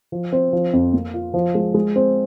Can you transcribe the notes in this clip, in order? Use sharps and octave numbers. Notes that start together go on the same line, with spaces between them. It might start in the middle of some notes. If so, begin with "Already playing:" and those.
F3
C4
F3
F2
A#3
F4
F3
G#3
G#3
C4